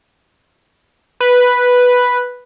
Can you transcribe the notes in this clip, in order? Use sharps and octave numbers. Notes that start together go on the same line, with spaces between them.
B4